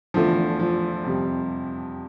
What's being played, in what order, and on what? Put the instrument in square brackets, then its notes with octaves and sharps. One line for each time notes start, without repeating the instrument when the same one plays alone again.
[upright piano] E2 D3 A3 D4 [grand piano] F3
[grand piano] F3
[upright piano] F2 C3 G3